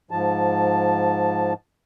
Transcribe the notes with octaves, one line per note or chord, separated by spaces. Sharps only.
G#2 F3 A5